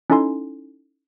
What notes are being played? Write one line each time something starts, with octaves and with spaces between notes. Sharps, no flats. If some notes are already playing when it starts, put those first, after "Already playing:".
C#4 D#4 E4 A4 G#5 C6